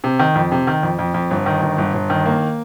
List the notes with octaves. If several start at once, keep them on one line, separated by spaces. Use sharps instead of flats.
C3
D#3
F2
C3
D#3
F2
F2
F2
G1
D#3
G1
G1
G1
D#3
A#3